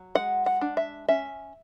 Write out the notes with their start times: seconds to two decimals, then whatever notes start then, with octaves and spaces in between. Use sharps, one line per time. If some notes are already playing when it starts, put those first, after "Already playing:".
Already playing: F#3
0.15 G#3 F#5
0.46 F#5
0.61 D4
0.77 E5
1.09 C#4 E5